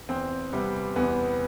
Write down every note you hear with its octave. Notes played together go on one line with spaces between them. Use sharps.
E2 C4
C3 G3 B3
E2 B3